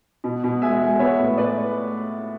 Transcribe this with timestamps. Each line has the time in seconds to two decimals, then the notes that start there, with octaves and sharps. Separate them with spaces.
0.24 B2
0.44 B2
0.62 G#3 E5 G#5
0.81 G#3
0.99 B3 C#5 E5
1.19 A2
1.37 A2 B4 D5